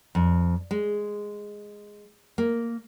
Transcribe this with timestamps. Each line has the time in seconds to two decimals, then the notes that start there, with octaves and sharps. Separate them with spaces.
0.15 F2
0.71 G#3
2.38 A#3